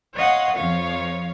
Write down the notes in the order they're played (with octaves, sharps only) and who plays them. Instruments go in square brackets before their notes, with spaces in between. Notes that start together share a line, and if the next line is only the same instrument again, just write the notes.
[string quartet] C#5 D#5 F5 F#5 C6
F2 F3 C#5 F5